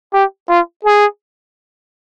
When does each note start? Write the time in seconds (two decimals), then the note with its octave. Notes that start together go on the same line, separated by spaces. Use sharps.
0.13 G4
0.49 F4
0.85 G#4